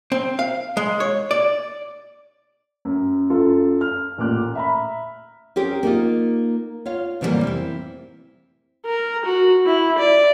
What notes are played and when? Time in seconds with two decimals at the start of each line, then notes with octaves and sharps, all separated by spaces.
0.12 C4
0.39 F5
0.77 G#3
1.00 C#5
1.31 D5
2.85 F#2
3.30 F#2 F4 A4
3.81 F6
4.18 A1 A#2 D6 F#6
4.55 E5 A#5 B5
5.56 C4 C#4 G4 G#4 A#4
5.83 A#3 D#4 F4
6.86 F4 C#5 F5
7.21 A2 C3 E3 F#3 G3 A#3
7.43 C4 E4
8.86 A#4
9.26 F#4
9.66 E4
9.99 D5